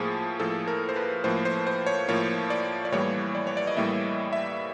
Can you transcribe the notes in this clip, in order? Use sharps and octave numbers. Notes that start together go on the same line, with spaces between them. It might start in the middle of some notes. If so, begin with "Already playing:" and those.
Already playing: A2 F3 A#3 G#4
A2 F3 A#3 A4
A#4
C5
B4
A2 F3 A#3 C5
C5
C5
C#5
A2 F3 A#3 C#5
D5
D5
A2 E3 G3 A#3 C#5
D5
C#5
D5
D#5
A2 E3 G3 A#3 E5
E5